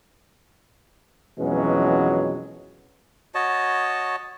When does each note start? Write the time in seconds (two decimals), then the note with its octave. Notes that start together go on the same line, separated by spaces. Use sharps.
1.40 F2 B2 E3 F#3 G#3 C#4
3.35 F#4 C#5 D#5 A5